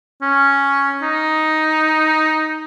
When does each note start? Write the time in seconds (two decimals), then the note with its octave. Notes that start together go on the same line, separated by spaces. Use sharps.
0.22 C#4
1.02 D#4